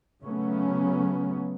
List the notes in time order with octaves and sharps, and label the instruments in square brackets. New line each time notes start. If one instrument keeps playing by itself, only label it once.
[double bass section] C#3 F#3 A3 B3 C#4